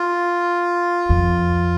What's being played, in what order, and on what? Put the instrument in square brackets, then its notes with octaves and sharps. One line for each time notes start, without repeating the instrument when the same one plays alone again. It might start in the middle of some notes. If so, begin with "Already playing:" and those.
Already playing: [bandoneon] F4
[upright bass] F2